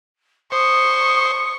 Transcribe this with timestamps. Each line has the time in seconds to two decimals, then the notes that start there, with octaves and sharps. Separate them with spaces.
0.52 C5 C#6 D#6